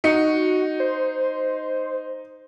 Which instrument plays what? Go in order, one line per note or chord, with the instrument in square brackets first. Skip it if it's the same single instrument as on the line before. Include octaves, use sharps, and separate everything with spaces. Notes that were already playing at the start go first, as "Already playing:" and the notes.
[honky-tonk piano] D#4 C#7 [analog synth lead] F#4
[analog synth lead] C5